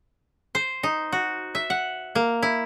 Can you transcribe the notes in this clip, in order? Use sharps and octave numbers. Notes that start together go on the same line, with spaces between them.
C5
D#4
F#4
E5
F#5
A#3
E4